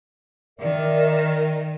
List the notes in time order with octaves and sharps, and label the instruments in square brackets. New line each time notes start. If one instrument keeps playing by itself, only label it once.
[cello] D#3 [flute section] A#4 D5 E5